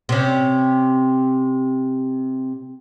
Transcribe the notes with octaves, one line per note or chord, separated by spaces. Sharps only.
C3 C#4